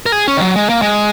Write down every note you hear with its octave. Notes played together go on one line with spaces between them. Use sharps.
A#4
G#4
C#4
D#3
F#3
G#3
A#3
G#3